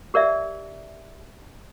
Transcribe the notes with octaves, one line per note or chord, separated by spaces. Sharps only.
G4 A#4 D5 E5